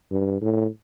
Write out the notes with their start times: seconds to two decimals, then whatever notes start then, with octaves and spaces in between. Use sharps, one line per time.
0.12 G2
0.41 A2